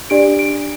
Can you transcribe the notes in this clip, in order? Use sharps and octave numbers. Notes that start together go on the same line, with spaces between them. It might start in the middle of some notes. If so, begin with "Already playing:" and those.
D4 G4 D5 D7
D7